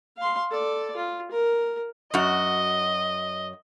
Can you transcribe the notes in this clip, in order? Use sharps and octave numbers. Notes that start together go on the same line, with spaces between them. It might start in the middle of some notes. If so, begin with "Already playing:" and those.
F5 C6
A4 D5
F4
A#4
F#2 F#4 D#5